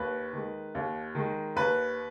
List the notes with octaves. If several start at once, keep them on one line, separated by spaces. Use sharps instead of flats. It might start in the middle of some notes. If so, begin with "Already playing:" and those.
Already playing: D#2 B4
D#3 G#3
D#2
D#3 G#3
D#2 B4